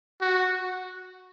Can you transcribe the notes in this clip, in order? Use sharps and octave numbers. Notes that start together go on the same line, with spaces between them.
F#4